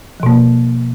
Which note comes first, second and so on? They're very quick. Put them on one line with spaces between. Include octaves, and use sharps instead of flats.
F3 B2 A#3